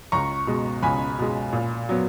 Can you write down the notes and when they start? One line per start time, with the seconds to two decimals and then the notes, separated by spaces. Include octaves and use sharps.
0.12 C#2 A#5 C#6
0.47 B2 G#3
0.83 C#2 G#5 B5
1.19 B2 G#3
1.53 A#2
1.89 F#3 B3